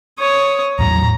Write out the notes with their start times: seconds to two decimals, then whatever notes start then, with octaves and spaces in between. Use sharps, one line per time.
0.19 C#5 D#6
0.79 E2 A2 F#3 A#5